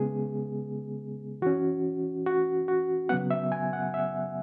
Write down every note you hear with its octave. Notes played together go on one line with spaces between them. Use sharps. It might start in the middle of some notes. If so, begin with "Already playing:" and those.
Already playing: C#3 G#3 B3 G#4
E3 C#4 F#4
F#4
F#4
C#3 F#3 B3 F#5
E5
G#5
F#5
E5